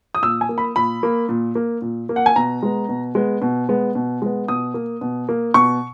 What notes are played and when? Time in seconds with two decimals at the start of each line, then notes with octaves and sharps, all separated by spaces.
0.15 D#6
0.22 A#2 E6
0.41 G#5
0.49 A#3
0.58 B5
0.76 A#2 B5
1.03 A#3
1.29 A#2
1.55 A#3
1.82 A#2
2.09 A#3
2.16 F#5
2.26 G#5
2.36 B2 A#5
2.63 G#3 B3
2.89 B2
3.15 G#3 B3
3.42 B2
3.69 G#3 B3
3.95 B2
4.22 G#3 B3
4.48 B2 D#6
4.74 A#3
5.01 B2
5.29 A#3
5.54 B2 C#6